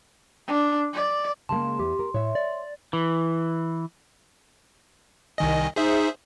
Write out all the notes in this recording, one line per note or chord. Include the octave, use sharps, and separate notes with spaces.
D4
D5
C#3 G#3 A#3 A5 C6
E2 E3 G4
A#4
A2 C#5 E5
D5
E3
C2 D#3 D#5 G#5
D#4 G#4 C5 E5